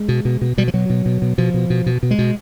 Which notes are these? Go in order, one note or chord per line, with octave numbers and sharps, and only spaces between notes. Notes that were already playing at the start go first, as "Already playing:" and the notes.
Already playing: G#3
B2
B2
B2
B2 G3
F3
B2 F#3
B2
B2
B2
B2 F3
B2
B2
B2
B2
G#3
B2